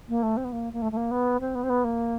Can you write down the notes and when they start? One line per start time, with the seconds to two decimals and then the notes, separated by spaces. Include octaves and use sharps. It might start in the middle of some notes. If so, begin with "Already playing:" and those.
0.09 A#3
0.23 A3
0.37 C4
0.44 B3
0.52 A#3
0.73 A#3
0.82 A3
0.92 A3
0.97 A#3
1.11 B3
1.40 C4
1.55 B3
1.63 C4
1.70 B3
1.84 A#3